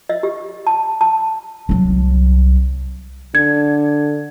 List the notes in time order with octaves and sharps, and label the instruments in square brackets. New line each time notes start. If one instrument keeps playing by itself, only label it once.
[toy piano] D#5
G4
A5
A5
[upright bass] C2 F#3
[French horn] D3 [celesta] G#6